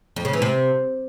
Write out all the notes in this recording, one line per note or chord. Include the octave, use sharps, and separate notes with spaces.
F2
C#3
E3
C3